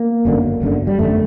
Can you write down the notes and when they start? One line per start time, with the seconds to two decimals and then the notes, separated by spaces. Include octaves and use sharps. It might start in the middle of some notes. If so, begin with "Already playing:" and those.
Already playing: A#3
0.25 G1 F#2 D3
0.62 G1 F#2 D3
0.87 G3
0.99 G1 F#2 D3 A3